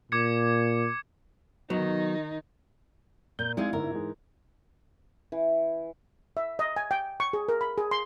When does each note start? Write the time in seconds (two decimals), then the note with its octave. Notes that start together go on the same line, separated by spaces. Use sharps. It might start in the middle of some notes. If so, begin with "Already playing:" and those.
0.12 A#2 D6 G#6 C#7
1.70 D#3 F#3 B3 D#4
3.39 A#2 G6
3.57 G#3 C4 D#4 E4 D5 F5 G#6
3.73 G1 G#2 A#4
3.91 G#2 E3 G#3
5.32 E3
6.37 E5
6.59 D#5
6.76 G#5
6.91 G5
7.20 C#6
7.33 G#4
7.49 A#4
7.61 B5
7.78 G#4
7.91 C6